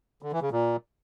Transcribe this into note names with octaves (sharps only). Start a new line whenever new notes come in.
D3
E3
C#3
A#2